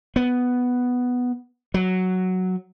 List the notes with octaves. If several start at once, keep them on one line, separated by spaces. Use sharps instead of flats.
B3
F#3